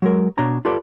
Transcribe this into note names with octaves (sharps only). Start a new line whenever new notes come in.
F#3 G#3 A#4
B2 D4 C#5 A#5
F4 G4 A4 B4 D5